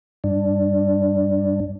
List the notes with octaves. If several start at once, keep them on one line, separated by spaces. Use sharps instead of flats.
G2 D4